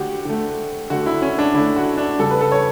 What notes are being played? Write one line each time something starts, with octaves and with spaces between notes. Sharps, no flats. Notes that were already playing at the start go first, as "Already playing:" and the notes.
Already playing: D3 A3 F#4 G4
D3 A3
D3 A3 F#4
E4
C#4
D4
D3 A3 E4
F#4
D4
C#3 G3 A4
B4
A4
C#5